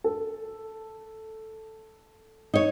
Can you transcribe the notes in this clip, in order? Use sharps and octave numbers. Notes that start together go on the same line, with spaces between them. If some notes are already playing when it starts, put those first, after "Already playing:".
A4
D#4 C#5